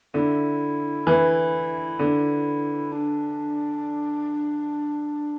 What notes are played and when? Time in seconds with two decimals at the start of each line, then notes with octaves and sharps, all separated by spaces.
0.14 D3 E4
1.07 E3
1.99 D3
2.92 D4